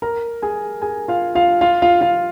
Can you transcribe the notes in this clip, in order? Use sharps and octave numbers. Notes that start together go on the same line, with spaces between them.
A#4 A#5
G#4 G#5
G#4 G#5
F4 F5
F4 F5
F4 F5
F4 F5
F4 F5